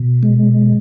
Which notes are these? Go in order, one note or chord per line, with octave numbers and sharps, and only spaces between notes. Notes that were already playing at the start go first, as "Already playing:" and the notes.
Already playing: B2
G#3